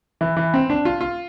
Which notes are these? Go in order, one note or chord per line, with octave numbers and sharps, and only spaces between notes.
E3
E3
C4
D4
F4
F4